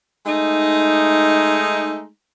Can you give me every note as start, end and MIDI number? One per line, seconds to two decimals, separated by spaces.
0.24 2.06 56
0.24 2.06 57
0.24 2.06 63